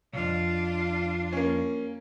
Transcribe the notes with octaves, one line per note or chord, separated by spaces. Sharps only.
B1 F2 D4 F4
A#3 C#4